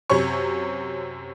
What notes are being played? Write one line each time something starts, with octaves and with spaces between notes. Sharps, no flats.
F#2 C3 C#5 C#6